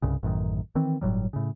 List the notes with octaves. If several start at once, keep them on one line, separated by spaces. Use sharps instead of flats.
C2 G2 C#3
A1 F#2 D#3
D#3 E3 C4
G1 A2 F#3 G3
A2 C#3